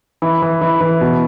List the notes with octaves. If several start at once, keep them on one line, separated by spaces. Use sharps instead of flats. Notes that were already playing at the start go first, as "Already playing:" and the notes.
E3
E3
E3
E3
B2